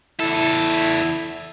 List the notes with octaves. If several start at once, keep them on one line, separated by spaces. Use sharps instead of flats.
E2 E4 A4